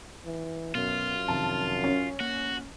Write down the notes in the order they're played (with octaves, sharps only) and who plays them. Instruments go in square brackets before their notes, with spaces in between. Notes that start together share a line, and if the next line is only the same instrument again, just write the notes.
[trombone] E3
[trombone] F#2 [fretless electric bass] B2 [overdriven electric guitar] F4
[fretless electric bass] F2 C3 D#3 [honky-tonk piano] A5
[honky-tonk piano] C#4
[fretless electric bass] A#3 [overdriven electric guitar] F#4